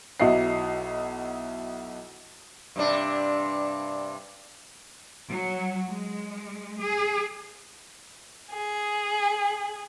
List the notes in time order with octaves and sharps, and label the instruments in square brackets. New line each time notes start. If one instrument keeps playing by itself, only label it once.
[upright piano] B1 F#3 E4 D#5 F#5 C7
[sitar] G2 C3 D4
[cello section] F#3
G#3
G#4
[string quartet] G#4